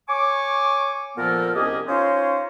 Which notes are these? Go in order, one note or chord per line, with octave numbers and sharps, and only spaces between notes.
C#5 G#5 C#6 D6
A#2 F3 B3 A4 A#4 F6
C2 C#4 G4 G#4 D#5 D6
C#4 D#4 F4 C5 C#5 F5